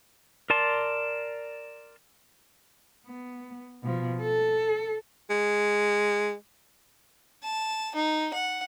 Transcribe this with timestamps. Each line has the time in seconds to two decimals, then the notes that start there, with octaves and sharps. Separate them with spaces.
0.50 A#4 D5 A5 C6
3.06 B3
3.84 B2 F3
4.22 A4
5.30 G#3
7.43 A5
7.95 D#4
8.34 F#5